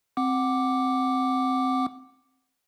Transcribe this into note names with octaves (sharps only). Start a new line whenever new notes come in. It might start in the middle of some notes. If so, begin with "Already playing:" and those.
C4 F#5 D6